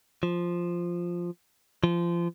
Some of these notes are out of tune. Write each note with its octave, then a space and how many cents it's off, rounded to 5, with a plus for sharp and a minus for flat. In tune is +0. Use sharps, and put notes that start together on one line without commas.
F3 +0
F3 -25